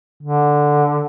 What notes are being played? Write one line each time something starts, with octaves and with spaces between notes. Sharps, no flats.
D3